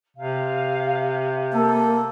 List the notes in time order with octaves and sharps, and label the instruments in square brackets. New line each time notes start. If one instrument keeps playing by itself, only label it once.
[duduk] C3 [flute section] F5
[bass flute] A#3 [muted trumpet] A4